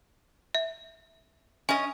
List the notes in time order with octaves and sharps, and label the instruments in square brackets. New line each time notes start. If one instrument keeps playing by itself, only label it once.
[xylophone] E5
[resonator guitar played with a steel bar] C#4 D#5 [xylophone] G#5